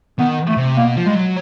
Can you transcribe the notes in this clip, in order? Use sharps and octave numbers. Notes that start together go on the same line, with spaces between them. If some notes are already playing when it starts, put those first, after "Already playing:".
D#3 B3
A3
C3
B2 A#3
F3
G3 G#3
F#3